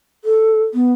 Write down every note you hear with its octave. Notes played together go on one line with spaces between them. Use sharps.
A4
B3